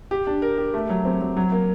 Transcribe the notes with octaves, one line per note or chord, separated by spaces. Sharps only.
G4
D4
A#4
G4
A3
F#3
C4
F#3
F#3
A#3